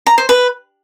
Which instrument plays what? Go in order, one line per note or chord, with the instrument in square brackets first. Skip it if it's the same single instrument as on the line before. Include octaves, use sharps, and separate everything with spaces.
[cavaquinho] A#5
C5
B4